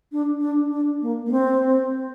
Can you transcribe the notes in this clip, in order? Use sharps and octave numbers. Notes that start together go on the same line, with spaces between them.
D4
D4
D4
A#3
A#3
C4